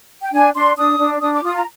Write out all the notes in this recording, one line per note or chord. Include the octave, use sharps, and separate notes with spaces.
G5
D4 G#5
D4 C6
D4 D#6
D4
D4 D#6
D6
F4 D#6
A#5